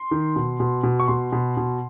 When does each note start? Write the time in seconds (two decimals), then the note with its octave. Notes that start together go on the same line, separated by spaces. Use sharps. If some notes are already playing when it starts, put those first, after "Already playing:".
Already playing: C6
0.11 D#3
0.36 B2
0.60 B2
0.83 B2
1.00 C#6
1.08 B2 C6
1.32 B2
1.57 B2